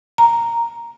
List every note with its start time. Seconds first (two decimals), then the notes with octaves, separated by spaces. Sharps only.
0.18 A#5